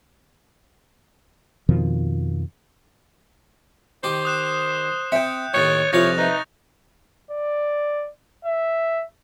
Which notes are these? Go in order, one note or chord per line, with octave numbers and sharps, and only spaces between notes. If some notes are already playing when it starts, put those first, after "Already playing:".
F2 B2 D#3 F3
D#3 G4 C5
D#6 F#6 E7
C4 E5 G5 G6 C#7
D#2 A2 D#3 C#5 C#6 F#6 A6
C2 F2 E4 F4 C#5 F5 A#6 F7
D#4 B4 E5 F#6
D5
E5